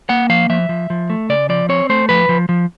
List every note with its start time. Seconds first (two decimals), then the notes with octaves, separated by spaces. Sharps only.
0.09 A#3 F#5
0.29 F3 F5
0.49 F3 E5
0.69 F3
0.90 F3
1.10 A3
1.29 C#3 D5
1.49 F3 D5
1.69 C4 C#5
1.89 A3 C5
2.09 F3 B4
2.29 F3
2.49 F3